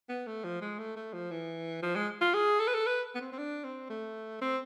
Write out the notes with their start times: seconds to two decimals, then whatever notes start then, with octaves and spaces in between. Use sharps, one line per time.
0.09 B3
0.27 A3
0.44 F3
0.61 G#3
0.79 A3
0.97 A3
1.13 F3
1.31 E3
1.82 F3
1.96 G#3
2.21 F4
2.34 G#4
2.60 A4
2.67 B4
2.74 A4
2.86 B4
3.15 B3
3.20 C4
3.32 C4
3.38 D4
3.64 C4
3.90 A3
4.41 C4